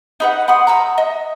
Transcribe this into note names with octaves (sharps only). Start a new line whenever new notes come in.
D#4 B4 F#5
F#5 B5 C6 D#6
A#5 B5 E6
D#5